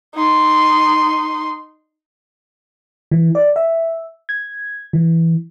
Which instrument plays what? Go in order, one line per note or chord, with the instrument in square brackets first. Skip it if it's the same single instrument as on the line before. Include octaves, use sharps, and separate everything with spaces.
[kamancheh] D#4 C6
[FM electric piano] E3
D5
E5
G#6
E3